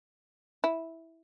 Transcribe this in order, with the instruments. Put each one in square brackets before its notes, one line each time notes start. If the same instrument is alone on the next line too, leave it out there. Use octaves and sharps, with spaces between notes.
[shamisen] E4